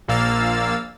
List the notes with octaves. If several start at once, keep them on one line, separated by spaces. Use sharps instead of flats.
A#1 A#2 A#3 F5 E6 A6